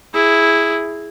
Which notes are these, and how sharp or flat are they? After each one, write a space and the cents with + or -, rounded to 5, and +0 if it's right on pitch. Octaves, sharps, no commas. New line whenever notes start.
E4 +0 G#4 +0